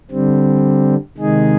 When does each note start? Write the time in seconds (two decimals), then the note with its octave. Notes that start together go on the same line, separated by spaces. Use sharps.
0.11 D3 G3 C4
1.18 C3 D#3 G#3 D#4 G#4